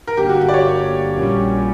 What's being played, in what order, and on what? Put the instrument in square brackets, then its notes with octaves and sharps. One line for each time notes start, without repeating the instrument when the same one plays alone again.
[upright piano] A#4
[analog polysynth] G1 G2 D3 A#3 [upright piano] G4
[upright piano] F#4
G4
D5
C#5
[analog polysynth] A#1 A#2 G3 C#4